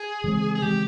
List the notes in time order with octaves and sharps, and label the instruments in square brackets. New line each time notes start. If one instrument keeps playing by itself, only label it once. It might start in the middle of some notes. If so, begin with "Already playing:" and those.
Already playing: [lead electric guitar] G#4
[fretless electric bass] C#3 E3 G#3 C4
[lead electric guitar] G#4
[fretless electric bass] C#3 E3 G#3 C4 [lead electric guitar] G4